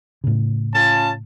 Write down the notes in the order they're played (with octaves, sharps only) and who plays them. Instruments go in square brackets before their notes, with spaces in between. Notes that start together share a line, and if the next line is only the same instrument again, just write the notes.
[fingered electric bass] A2 C#3
[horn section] C#4 F4 A5